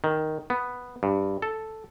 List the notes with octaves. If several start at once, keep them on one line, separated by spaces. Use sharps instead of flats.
D#3
B3
G2
A4